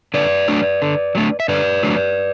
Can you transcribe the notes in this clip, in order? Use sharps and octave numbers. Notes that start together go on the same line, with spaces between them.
D3 B4 D5
F#3 A3 D4
D3
F#3 A3 D4
E5
D3 B4 D5
F#3 A3 D4